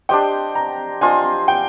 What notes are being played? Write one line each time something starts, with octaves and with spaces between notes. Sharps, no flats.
D4 G4 C5 D#5 G5
A#5
D4 F4 C5 D#5 G#5
G5